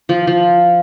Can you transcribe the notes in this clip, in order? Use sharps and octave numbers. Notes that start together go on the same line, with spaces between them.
F3
F3